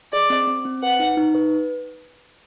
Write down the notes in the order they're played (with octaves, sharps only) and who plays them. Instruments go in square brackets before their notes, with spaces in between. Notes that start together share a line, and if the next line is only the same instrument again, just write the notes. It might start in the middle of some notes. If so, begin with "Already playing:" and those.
[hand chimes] G#4 [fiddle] D5
[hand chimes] C4
C4
C4
[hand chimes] B4 [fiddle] F#5
[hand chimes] D#4
D#4
B4